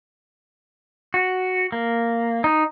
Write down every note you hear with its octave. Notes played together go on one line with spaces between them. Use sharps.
F#4
A#3
D#4